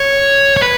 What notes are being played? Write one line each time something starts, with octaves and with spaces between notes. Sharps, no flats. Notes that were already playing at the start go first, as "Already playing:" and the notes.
Already playing: C#5
C#5
B4